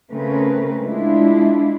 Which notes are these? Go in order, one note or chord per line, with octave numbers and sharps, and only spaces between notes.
C#3 A3 C4 C#4 A#4 B4
G#3 D4 E4 F4